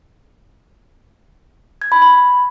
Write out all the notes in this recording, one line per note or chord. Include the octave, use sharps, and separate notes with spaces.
G#6
B5
B5